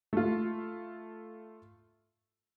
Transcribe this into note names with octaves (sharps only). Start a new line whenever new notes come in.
A3 F4